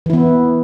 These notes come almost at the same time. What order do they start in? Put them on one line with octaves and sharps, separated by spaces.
E3 E4 B3